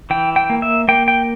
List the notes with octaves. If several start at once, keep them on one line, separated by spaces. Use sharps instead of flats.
E3 G5
G5
A#3
E5
A#3 G5
G5